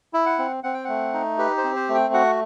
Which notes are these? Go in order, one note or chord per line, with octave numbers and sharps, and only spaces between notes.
E4 E5
F#5
C4
C4 F#5
G5
A3 F#5
D#4
G4 B4
C5
C4
C5
A3
G5
F#4 F#5